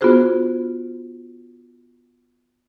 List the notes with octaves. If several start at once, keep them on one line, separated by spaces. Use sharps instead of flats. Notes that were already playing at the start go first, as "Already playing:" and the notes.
B3 D4 F4 F#4 G#4 C5